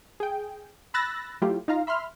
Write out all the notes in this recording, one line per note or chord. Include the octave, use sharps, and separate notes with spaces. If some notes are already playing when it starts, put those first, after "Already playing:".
G#4 G5
B5 E6 F#6 A6 A#6
F#3 A3 E4 F4 G4
D#4 F4 F5 A#5
E5 B5 C6 F6